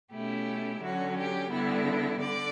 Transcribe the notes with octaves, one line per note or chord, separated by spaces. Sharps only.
B2 A3 C#4 E4 G4
D3 F#3 C#4 F#4
G4
D3 G3 B3 E4
D3 D5